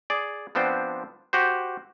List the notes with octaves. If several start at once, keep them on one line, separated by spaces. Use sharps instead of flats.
G#4 D5
F3 B3 C4 D4 C5
F#4 G4 C5